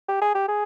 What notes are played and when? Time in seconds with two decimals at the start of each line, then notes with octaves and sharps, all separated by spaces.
0.09 G4
0.22 G#4
0.35 G4
0.48 G#4